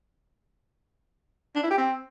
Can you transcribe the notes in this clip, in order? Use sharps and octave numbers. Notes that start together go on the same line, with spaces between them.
D4
E4
G4
C4